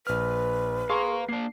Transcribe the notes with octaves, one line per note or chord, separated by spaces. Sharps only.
A#1 B4 F6
G#4 F5 A5 A#5 C6 C#6
A#3 D4 C7